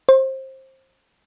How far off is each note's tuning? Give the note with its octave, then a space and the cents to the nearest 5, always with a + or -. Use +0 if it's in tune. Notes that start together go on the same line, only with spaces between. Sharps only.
C5 +25